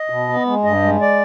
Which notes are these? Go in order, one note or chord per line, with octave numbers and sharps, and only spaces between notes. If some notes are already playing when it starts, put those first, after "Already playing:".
Already playing: D#5
B2
B3
G#3
G2 D#5
G#3
D5